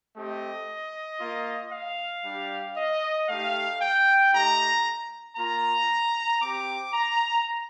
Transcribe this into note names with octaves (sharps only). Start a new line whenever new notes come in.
A3 C4 G4 D#5
A#3 F4
F5
G3 D4 G4
D#5
A3 D#4 G4 F5
G5
A3 D#4 G4 A#5
A#3 F4 A#5
C4 G4 D6
A#5